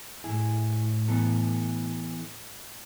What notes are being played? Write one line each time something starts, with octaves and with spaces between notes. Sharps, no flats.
A2 E4 G#4
E3 B3 A4